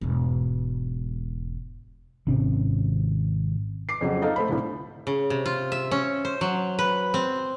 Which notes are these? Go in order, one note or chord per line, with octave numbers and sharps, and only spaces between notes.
E1 G#2
G#1 C3 C4 C#4
D6 C7
F2 C#3 F#3
D#4 A4 F5
A3 C5 B5
C2 A2 D3
C#3
C3
F4
E5
C#4
C5
F#3
B4
C4